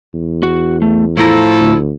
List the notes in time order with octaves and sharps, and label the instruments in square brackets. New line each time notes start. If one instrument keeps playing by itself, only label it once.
[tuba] E2
[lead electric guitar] F#4
A3
[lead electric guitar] A2 A#5 [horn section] F3 A4 [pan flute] E4
[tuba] D2